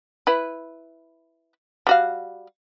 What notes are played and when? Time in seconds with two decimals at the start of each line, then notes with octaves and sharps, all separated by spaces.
0.27 E4 B4
1.87 G3 F#4 F5